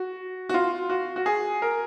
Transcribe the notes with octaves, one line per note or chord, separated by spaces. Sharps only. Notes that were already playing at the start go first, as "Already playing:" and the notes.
Already playing: F#4
F#4
F4
F#4
F#4
G#4
A#4